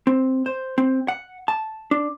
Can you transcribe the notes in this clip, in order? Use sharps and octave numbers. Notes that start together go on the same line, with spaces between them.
C4
C5
C4
F#5
A5
D4